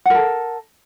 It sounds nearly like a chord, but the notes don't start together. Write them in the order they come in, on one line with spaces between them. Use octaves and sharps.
F#5 A#4 A4